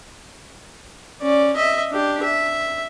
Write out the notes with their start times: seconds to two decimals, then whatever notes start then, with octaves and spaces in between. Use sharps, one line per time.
1.22 C#4 D5
1.56 D#5 E5
1.92 D4 G4
2.23 E5